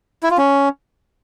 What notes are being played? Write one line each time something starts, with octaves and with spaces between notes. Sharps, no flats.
E4
F4
C#4